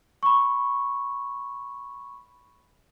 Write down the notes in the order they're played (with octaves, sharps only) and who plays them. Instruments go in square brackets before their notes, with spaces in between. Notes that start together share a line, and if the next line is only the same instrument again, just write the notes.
[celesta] B5 C#6